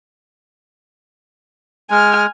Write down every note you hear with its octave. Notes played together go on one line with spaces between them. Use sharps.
G#3 G#5 F6